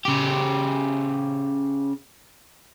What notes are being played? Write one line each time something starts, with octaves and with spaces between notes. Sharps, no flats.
C#3 G4